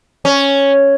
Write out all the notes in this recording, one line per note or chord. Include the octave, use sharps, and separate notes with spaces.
C#4